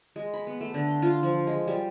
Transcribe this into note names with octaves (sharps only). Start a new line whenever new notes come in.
G#3
B5
B3
A3
D3
C6
F4
F3
G#3
G3